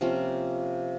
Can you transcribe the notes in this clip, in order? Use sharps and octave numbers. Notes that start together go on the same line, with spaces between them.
C3 F3 A#3 C#4